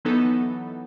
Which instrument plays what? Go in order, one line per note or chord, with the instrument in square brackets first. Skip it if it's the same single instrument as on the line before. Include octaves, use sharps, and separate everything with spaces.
[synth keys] E3 F#3 B3 D#4 A4